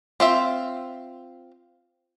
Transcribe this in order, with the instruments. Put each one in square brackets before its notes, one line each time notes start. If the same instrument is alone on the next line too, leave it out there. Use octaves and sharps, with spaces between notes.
[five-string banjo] C4 F4 E5